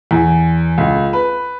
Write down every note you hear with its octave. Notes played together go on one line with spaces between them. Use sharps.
E2
C#2
B4